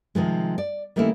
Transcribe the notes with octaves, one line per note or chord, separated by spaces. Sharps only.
C3 D#3 F3 G#3
D5
D#3 G3 A3 A#3 C#4 E4